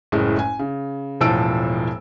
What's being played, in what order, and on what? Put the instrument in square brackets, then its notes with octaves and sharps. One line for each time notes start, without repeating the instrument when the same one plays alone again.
[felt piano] F#1 A2 G#3
G#5
C#3
E1 A2 F3 A5 E6 D7